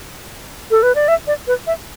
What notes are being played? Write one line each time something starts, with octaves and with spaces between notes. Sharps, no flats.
A4
B4
D5
E5
D5
B4
E5